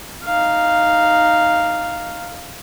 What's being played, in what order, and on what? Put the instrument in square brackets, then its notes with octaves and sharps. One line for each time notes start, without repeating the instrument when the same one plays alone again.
[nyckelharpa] D#4 F5